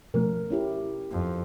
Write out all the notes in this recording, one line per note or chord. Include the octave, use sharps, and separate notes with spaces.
B2 F3 A3 C#4 A#4
C#4 E4 G4
F2